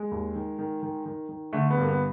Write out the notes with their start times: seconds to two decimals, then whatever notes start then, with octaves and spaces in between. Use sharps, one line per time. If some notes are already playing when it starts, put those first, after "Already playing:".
Already playing: G#3
0.11 D#2
0.35 D#3
0.59 D#3
0.83 D#3
1.06 D#3
1.29 D#3
1.53 D3 A3
1.70 B3
1.77 G2
1.83 A#3
1.88 B3